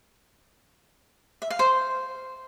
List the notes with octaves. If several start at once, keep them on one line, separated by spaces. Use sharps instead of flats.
E5
F5
C5